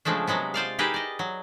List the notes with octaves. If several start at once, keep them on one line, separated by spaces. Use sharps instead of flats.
C#3 F3 G#3 A3 D4
C3 F#3 G#3 B3
F4 C5 D5 F5
D#4 E4 G4 G#4 A#4 B4
D5 D#5
F#3